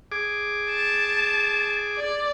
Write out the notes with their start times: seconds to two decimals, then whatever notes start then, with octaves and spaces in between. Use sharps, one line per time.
0.12 G#4 D6
0.70 A5
1.97 D5